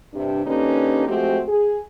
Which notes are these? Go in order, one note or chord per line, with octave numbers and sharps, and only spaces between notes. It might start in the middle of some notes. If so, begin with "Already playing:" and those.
G2 C3 D4
D3 A#3 C#4 D#4 G4 B4
F3 G#3 A3 C4 F#4 G4
G#4